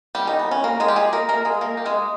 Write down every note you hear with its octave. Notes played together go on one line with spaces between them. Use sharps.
G3 G4
D#3 D#4
B3
C#4
A#3 A#4
G#3 G#4
G4
G#3 G#4
A#3 A#4
A#3 A#4
G#3 G#4
A#3 A#4
G4
G#3 G#4